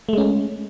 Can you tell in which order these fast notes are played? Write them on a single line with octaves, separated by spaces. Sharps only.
A3 G#3 C#4